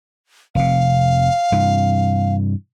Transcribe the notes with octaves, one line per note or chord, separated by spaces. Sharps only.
F1 C3 F5
G2 C3 E3